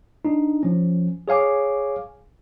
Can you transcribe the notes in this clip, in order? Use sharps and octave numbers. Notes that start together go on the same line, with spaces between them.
D4 D#4
F3 C#4
G#4 C#5 F5 G#5 D6